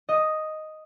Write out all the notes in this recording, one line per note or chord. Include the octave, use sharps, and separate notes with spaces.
D#5